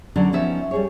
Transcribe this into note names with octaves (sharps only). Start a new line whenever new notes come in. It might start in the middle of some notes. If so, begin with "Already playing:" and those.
D3 F#3 C#4 D4
F3 B3 C#4 D#4 E5
G3 G#4 C#5